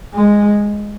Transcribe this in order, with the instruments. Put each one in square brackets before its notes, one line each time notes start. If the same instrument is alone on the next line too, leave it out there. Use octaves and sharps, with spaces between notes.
[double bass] G#3